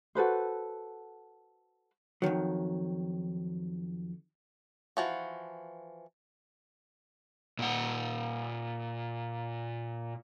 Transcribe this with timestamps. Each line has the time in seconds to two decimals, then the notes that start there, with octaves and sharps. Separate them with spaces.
0.15 F#4 A4 B4 C5
2.22 F2 G#2 D#3 F#3
4.97 E3 F3 F#4
7.59 A#2 F#5